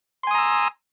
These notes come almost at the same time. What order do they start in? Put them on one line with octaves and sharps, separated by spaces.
C6 G#5 D#6 A#5 E6